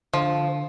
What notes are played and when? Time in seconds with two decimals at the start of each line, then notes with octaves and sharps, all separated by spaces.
0.13 D3 F3